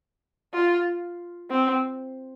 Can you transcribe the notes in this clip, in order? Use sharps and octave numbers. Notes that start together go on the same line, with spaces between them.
F4
C4